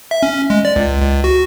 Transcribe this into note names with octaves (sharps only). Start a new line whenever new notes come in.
E5
C#4
G#3
D5
C#2
C#2
F#4